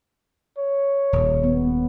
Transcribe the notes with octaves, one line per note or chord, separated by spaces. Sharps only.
C#5
D#1
B3